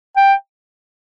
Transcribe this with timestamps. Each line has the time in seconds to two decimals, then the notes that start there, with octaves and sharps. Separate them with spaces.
0.17 G5